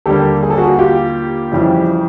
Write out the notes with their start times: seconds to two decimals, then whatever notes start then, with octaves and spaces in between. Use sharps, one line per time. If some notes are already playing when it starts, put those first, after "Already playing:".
0.06 D#2 D3 G3 A#3 G4 A4
0.43 G#4
0.50 A4
0.58 F#4 G#4
0.71 F#4
0.79 F4 G4
1.51 F2 C#3 E3 G3